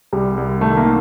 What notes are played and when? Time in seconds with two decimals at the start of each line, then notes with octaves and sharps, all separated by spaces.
0.13 C2 G3
0.37 C2
0.61 D#3 A3
0.77 A#3
0.85 D#3